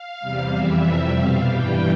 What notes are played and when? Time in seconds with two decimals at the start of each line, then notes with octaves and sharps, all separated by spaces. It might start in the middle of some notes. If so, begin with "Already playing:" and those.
Already playing: F5
0.21 E2 C3 G3
0.53 F2 E3 G3 E5
0.84 F2 C3 G3
1.16 B2 G3 F5
1.47 G2 E3 G3 G5